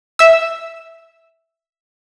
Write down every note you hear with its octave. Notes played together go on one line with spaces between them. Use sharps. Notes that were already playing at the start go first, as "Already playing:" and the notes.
E5 E6